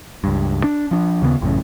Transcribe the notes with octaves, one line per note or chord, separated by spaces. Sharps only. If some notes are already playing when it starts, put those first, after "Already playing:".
C#2 G2
D4
F3 D4
D#2 C#3 A3 B3
A1 F#2 A2 C#3